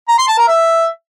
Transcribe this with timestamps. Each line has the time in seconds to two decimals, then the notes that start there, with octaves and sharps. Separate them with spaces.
0.09 A#5
0.18 C6
0.28 A5
0.38 A#4
0.48 E5